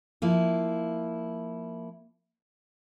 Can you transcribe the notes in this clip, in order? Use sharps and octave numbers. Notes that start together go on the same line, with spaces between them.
F3 A#3 E4